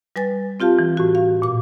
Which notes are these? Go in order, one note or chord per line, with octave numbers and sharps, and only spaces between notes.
G3 B4 G#5 A6
C4 F4 G4 F5 A5
E3
A2 F#4
F5
A#2 D6